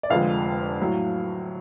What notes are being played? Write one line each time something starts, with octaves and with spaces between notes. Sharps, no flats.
D5
F1 F2 D3 F3 G#3 F5
A2 F#3